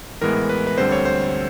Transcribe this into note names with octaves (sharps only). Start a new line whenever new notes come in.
A2 E3 G#3 B3 A#4
B4
B4
D2 D3 G3 C4 C5
C#5
C5